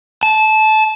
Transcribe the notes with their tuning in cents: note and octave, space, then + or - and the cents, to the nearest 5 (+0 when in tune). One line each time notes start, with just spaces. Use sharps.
A5 -20